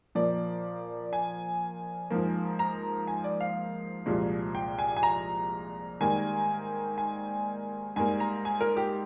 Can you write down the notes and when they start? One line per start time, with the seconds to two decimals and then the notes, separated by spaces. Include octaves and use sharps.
0.15 A#2 F3 A#3 D5
1.13 G#5
2.10 G#2 F3 A#3
2.59 A#5
3.07 G#5
3.24 D5
3.41 F5
4.06 C2 A#2 F3 G#3
4.55 G5
4.79 G#5
4.97 G#5
5.03 A#5
6.00 G#2 D#3 G3 A#3 G#5
6.98 G#5
7.96 G#2 G3 A#3 G#5
8.20 A#5
8.45 G#5
8.61 A#4
8.77 G4